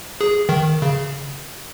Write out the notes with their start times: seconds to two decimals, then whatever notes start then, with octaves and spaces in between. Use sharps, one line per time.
0.21 G#4
0.49 D#3
0.82 C#3